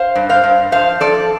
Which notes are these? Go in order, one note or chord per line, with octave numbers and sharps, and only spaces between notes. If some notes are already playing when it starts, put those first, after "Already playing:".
Already playing: C5 F5
G2
C5 F5
G2
F3 C5 F5
F3 A4 D5